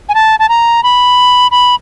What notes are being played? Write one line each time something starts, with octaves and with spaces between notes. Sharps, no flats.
G#5
A5
A5
A#5
B5
B5